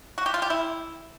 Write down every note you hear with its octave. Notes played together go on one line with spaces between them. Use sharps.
F#4
G4
F4
G4
E4